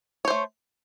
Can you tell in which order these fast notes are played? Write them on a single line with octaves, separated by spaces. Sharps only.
C#5 C5 A3